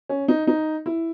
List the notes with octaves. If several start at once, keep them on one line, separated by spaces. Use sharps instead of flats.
C#4
D#4
D#4
E4